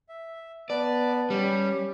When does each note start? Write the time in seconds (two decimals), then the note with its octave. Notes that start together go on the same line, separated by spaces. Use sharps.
0.09 E5
0.70 B3 B4 D5 A5
1.30 G3 C#4